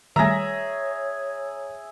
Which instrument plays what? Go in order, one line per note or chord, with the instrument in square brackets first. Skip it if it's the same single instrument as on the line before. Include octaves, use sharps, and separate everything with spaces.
[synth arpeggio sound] D#3 G3 A3 [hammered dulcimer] G#4 E5 [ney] C#5 [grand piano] A#5 A#6